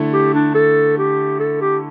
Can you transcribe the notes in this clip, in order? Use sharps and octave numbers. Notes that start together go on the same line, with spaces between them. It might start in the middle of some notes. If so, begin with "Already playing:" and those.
Already playing: D3 A3 E4
G4
D4
A4
G4
A4
G4